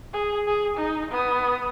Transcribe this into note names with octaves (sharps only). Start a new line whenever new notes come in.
G#4
G#4
D#4
B3 D#6